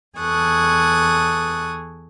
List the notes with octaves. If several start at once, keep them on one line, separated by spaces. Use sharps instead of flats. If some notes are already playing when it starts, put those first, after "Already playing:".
E2 G#4 A4 C#6 D#6 F#6